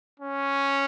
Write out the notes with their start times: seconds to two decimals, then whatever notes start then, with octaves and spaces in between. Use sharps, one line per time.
0.20 C#4